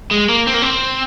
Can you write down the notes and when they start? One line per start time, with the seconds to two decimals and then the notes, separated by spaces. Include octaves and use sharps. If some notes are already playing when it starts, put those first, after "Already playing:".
0.11 G#3
0.29 A#3
0.47 C4
0.54 A#3
0.62 C4